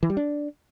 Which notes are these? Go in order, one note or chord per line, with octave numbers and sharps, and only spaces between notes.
E3
G3
D4